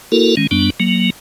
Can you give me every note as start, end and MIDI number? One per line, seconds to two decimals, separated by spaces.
0.12 0.35 58
0.12 0.35 64
0.12 0.35 66
0.12 0.35 69
0.12 0.35 70
0.37 0.47 51
0.37 0.47 56
0.37 0.47 61
0.51 0.70 42
0.51 0.70 55
0.51 0.70 59
0.51 0.70 62
0.80 1.10 54
0.80 1.10 58